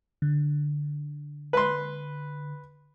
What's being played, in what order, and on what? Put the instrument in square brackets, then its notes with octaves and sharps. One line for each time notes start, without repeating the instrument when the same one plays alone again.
[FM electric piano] D3
[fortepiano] B4 C6